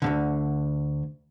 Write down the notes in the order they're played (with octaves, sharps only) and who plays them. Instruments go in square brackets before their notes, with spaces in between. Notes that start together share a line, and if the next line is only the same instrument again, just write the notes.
[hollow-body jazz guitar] D2 G#2 D3